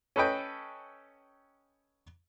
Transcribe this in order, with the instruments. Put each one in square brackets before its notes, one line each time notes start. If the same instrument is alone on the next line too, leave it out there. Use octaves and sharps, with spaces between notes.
[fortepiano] C#4 A4 B4 D#5 G5